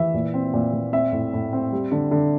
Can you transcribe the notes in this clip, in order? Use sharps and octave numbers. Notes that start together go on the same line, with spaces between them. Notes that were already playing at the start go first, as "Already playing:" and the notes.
Already playing: E3 E5
A#2
C4
A#2
A#2
C4 E5
A2
A2
C4
G3
D3
D3